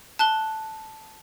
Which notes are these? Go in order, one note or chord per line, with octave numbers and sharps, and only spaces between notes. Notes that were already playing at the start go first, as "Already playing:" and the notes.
A5 F#6 G7